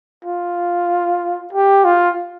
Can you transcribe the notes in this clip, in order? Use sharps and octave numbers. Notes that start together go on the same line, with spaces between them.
F4
G4
F4